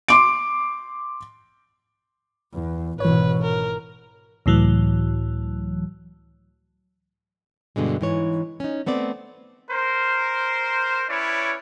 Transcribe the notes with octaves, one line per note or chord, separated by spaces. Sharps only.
C6 D6 D7
E2
G#1 B2 E3 B4 C#5
A#4
C#2 A2 E3 F#3
G2 B2 D3 G#3
G#2 E3 C#5
C#4 D#4
A3 B3 C4 D5
A#4 C5
C#4 E4 B4 C#5 D5